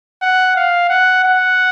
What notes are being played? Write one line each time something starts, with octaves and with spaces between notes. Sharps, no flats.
F#5
F5
F#5
F#5